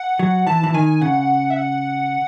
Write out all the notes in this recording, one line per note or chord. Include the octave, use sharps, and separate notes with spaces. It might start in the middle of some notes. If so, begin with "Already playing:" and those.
Already playing: F#5
F#3
E3 A5
E3
D#3 G#5
C#3 F#5
E5
F#5